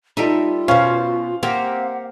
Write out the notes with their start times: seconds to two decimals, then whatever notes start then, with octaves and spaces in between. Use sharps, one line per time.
0.17 G3 D#4 F4 A4 E5
0.68 B2 C#4 C5 F5
1.43 A#3 C4 G4 A#4 F#5